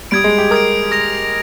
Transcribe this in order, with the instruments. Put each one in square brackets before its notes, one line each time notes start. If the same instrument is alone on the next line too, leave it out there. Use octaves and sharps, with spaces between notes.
[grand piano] G3 [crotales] D#6 G#6 D7
[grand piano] G#3
G4
[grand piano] A#4 [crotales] D#6 G#6 D7
[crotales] D#6 A#6 F7